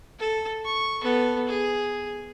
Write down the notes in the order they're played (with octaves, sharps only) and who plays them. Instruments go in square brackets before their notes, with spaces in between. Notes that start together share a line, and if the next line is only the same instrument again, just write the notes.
[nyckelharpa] A4
C#6
B3 A4
G#4